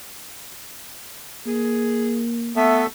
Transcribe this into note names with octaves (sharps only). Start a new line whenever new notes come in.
A#3 G#4
A3 B3 A4 E5